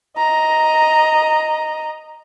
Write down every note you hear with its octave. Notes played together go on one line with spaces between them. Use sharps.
D#5 A#5